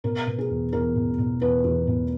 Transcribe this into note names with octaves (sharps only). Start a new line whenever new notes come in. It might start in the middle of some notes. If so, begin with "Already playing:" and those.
B2 A#4
B2
G#4
E2
E2 A#4
B2
B2
E2 B4
E2
B2